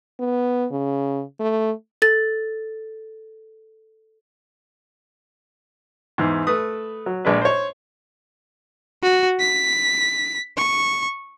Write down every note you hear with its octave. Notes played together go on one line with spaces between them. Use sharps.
B3
C#3
A3
A4 A6
E2 G#2
A3 B4 D#6
F#3
A#1 G#3 D4 B4
C5 C#5
F#4
B6
C#6